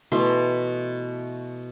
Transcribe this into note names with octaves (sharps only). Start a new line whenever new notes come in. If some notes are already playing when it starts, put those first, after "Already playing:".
B2 E3 A3 C6